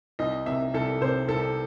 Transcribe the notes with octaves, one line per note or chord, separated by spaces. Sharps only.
C2 D#5
C3 E5
C2 A4
C3 C5
C2 A4